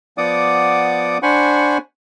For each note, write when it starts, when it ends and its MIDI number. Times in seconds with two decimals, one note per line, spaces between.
0.18 1.18 53
0.18 1.18 59
0.18 1.18 74
0.18 1.18 78
0.18 1.18 86
0.18 1.18 87
1.23 1.78 62
1.23 1.78 72
1.23 1.78 78
1.23 1.78 80
1.23 1.78 83
1.23 1.78 85